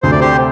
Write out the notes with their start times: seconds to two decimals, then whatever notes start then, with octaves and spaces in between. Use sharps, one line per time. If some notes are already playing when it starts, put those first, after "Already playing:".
0.03 D2 C3 A3 C5
0.11 D5
0.21 G4 C5